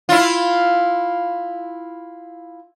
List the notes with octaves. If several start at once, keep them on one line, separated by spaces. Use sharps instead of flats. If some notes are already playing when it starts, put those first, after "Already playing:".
E4 F4